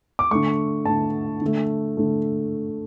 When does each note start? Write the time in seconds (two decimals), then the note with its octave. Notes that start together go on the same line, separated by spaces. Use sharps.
0.19 D6
0.31 D3 A3 C#6
0.85 D3 A3 A5
1.41 D3 A3
1.97 D3 A3